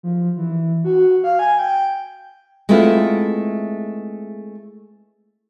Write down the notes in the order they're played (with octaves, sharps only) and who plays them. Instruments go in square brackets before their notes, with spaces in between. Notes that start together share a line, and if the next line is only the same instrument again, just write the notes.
[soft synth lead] F3
E3
F#4
F5
G#5
G5
[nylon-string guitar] G#3 A3 B3 C4 E4 F4